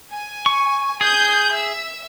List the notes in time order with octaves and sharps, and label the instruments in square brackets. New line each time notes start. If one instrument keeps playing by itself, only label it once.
[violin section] G#5
[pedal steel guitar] C#6
[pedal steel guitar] G#4 [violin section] D#6 G6
[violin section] E5 E6